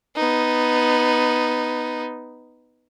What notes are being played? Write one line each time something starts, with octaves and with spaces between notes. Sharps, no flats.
B3 D#4